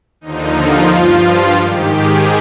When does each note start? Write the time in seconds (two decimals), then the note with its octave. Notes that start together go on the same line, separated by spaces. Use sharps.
0.21 D#2 D3 F3 D#4
0.55 F4
0.90 G2 F3
1.23 F4
1.57 G#2 D#3 G4
1.91 G#4